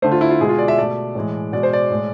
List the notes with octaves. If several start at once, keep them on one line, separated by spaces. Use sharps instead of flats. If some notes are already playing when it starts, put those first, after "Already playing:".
D3 A3 C5
F4
E4
F4
B2 G#3 G#4
F4
D5
E5
B2 A3 D5
A2 E3 G#3
B2 G#3 D5
C5
D5
A2 G#3